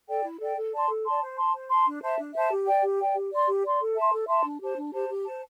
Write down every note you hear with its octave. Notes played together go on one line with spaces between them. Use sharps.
A4 D5 G5
E4
A4 D5 G5
A4
D5 A5 C6
A4
D5 A5 C6
C5
A5 C6
C5
A5 C6
D4
C5 E5 A5
D4
C5 E5 A5
G4
D5 G5
G4
D5 G5
G4
D5 C6
G4
D5 C6
A4
E5 A5 C6
A4
E5 A5 C6
D4
G4 C5 A5
D4
G4 C5 A5
G4
C5 A5